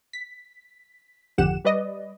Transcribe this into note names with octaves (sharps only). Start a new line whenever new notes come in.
B6
G#1 F2 D3 G4 F#5 E7
G3 B4 D5 D#5